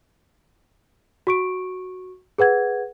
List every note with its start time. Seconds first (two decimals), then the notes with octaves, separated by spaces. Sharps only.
1.27 F#4 C#6 D7
2.38 G#4 B4 F#5 G#6